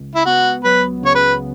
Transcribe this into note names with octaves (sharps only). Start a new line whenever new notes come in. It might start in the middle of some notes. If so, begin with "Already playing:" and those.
Already playing: C#2
E4
B3 F#4
F#3 B4
C#3 C#5
B4